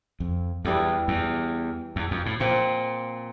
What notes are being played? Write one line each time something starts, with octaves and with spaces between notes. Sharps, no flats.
F2
E2 E3 G3 D4 A4
E2
E2
F2
A2
A#2 F3 C4 F4 C5